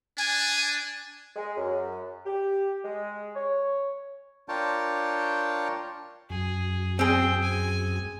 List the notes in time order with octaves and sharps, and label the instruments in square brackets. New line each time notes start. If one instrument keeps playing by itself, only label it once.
[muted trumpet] D4 [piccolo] G#5
[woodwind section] G#3
F#2
G4
G#3
C#5
[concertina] D4 F4 A#4 C#5 G5 A5
[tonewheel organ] F#2 [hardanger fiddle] G#4
[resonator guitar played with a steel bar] C4 G#4 [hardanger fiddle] G5
[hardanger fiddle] G#5